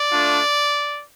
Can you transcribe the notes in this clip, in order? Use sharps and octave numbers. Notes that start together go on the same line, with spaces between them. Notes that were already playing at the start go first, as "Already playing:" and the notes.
Already playing: D5
A3 D4 F4